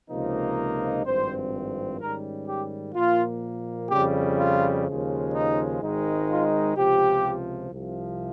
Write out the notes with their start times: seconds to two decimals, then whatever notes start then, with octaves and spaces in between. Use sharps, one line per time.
0.10 C#2 C3 F3 A#3 D#4
1.05 G#1 G2 F3 C4 C5
2.01 G#2 D#3 G3 C#4 A#4
2.48 G4
2.95 A#2 F3 A#3 F4
3.90 F2 C#3 G3 G4
4.39 F4
4.86 D#2 C#3 F3 G#3
5.33 D#4
5.81 G#1 G#2 D#3 G#3 D#4
6.28 F4
6.76 C#2 C3 F3 G4
7.71 C2 C3 F3